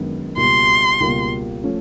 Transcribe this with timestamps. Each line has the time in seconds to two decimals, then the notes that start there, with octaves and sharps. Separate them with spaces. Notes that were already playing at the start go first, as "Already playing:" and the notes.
Already playing: F#2 D#3 G#3 B3 D4
0.37 C#2 B2 G3 A#3 C6
1.00 C#2 B2 G3 A#3
1.63 F3 A3 C#4